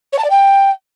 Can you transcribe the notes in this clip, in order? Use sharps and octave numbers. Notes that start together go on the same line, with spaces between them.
C#5
A5
D5
G5